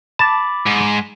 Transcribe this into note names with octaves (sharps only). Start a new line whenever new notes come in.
A5 B5 D6 A6
G#2